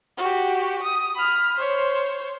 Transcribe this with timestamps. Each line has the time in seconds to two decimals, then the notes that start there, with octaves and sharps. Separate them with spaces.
0.18 F#4 G4
0.83 D#6
1.15 B5 F6
1.57 C5 C#5